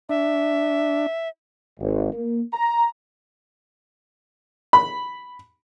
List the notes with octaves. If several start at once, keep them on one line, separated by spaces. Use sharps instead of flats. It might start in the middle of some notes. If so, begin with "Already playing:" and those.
D4 E5
G#1
A#3
A#5
B5